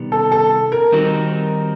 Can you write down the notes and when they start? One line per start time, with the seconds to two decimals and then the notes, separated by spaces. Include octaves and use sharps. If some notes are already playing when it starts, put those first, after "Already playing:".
Already playing: C3 D#3 G3 B3
0.12 A4
0.32 A4
0.72 A#4
0.92 D#3 G3 C4 D#4 F#4